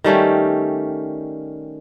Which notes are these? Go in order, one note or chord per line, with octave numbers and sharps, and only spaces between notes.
D#3 G3 A3 C#4